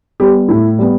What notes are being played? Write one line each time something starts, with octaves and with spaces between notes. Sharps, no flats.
G3 B3 G4
A2 E4
G3 B3